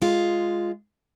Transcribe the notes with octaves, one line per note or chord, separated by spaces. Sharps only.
G#3 F4